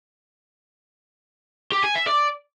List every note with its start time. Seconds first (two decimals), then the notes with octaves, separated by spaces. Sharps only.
1.72 G4
1.84 G#5
1.95 E5
2.07 D5